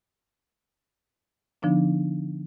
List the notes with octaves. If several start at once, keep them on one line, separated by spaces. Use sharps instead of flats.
D3 F3 B3 D4 D#4